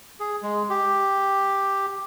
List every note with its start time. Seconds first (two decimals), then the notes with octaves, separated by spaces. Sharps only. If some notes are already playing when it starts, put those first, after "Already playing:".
0.20 G#4
0.42 G#3
0.70 G4